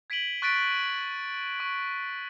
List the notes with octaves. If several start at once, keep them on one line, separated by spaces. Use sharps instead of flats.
G#6 B6 D7 D#7 F#7 G7
C#6 F#6 A6 B6 D7
C#6